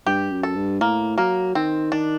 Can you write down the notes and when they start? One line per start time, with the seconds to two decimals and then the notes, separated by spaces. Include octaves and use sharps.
0.06 G2 G4
0.31 F#2
0.43 A4
0.56 G2
0.80 A2 A#3
1.18 F#3 A#3
1.55 D#3 C4
1.92 D#3 D4